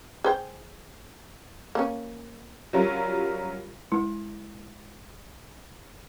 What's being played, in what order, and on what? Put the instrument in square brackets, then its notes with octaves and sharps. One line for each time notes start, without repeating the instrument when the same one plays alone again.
[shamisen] G#4 C5 G5
A#3 C#4
[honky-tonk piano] F#3 G3 C#4 F4 A#4
[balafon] G#3 E4